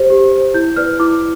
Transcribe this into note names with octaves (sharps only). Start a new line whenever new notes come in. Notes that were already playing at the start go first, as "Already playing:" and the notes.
Already playing: G4 C5
G4
C5
E4 G6
B4 D5 F6
E4 D6